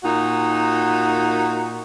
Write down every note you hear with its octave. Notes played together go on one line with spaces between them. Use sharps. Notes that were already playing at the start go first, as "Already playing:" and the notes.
A#2 D#4 F#4